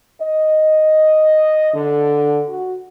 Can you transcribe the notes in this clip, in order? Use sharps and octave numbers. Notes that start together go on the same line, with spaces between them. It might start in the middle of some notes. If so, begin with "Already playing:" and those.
D#5
D3
F#4